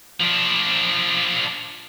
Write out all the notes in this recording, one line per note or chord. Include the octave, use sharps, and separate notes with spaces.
F3 D4